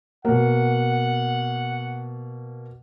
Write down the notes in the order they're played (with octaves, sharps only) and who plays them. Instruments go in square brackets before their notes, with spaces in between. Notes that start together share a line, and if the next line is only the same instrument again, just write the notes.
[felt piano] B2 A#3 [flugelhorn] F#5